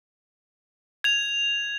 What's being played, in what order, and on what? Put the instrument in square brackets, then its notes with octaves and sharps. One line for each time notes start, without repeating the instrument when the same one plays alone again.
[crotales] G#6 F7